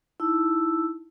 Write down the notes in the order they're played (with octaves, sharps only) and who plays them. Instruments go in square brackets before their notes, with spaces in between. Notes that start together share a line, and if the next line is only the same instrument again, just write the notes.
[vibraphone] D#4 E4 A5 E6